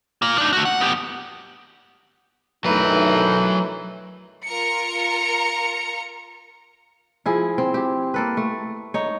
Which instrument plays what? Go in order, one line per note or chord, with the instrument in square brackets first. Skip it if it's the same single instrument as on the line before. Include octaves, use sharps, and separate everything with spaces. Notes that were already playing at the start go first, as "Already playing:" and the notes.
[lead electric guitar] A#3 F4
D4 D#4
A3 F#4
F#5
B3 G4
[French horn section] G2 D#3 A3 [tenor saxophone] E3 [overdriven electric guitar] F#3 B4 [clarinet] D#4
[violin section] F4 A#4 A#5 C#7
[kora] F3 E4 G#4
C4
G4
A#3 A4 B4
A3
D#4 C#5